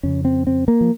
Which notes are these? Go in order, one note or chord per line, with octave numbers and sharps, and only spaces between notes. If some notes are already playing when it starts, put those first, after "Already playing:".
F2 C#3 C#4
C4
C4
A#3
F3